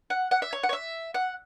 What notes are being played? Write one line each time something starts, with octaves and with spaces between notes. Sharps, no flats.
F#5
F#5
E5
C#5
F#5
C#5
E5
F#5